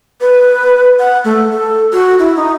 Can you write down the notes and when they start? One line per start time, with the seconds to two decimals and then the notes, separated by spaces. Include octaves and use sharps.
0.21 B4
0.99 F#5
1.25 A3
1.52 A4
1.93 F#4
2.19 E4
2.36 D#4